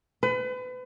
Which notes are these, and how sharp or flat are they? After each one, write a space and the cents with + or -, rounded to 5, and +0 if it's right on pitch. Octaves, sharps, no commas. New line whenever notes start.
B4 +35